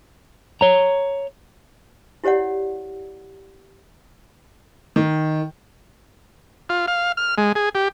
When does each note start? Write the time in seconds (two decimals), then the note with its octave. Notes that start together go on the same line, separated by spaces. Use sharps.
0.61 C#5 A#5
2.24 E4 G4 C#5 D5 F#5
4.96 D#3
6.69 F4
6.88 F5
7.17 F6
7.38 G#3
7.55 G#4
7.75 G4